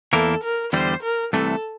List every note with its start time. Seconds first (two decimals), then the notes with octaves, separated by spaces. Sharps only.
0.13 E2 E3 A#3 E4 A4 A#4
0.43 A#4
0.73 E2 D3 G3 C5
1.03 A#4
1.33 C2 C3 E3 A3 A4